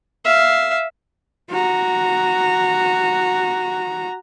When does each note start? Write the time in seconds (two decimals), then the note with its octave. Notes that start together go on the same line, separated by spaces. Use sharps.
0.25 E5 F5
1.50 F#4 A#5